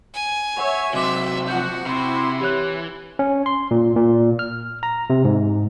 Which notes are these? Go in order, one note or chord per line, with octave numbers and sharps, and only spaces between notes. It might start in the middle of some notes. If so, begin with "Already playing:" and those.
G#5
C#5 E5 F#5
C3 F#3 F#4 C5 D#5 E5 C6 D6
F3 F#4 F#5 G6
C3 E4 C6
E3 G4 C#5 F#6
C#4
C6
A#2
A#2
F6
A#5
C3
G#2